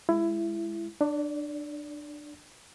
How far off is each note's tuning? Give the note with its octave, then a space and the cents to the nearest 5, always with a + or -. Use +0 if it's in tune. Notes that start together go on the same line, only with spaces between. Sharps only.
G#3 +0 E4 +20
D4 +20 D5 -25